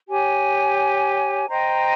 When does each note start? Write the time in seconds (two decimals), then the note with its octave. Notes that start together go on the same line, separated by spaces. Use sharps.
0.08 G4 C#5 G#5
1.48 C5 D#5 G5 A#5